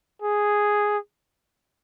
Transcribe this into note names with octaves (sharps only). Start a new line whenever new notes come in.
G#4